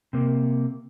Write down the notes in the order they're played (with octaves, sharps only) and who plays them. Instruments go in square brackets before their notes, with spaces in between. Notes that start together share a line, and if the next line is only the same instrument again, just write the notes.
[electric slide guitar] C3 A#3